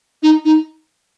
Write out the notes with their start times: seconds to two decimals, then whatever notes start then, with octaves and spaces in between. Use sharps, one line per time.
0.23 D#4
0.45 D#4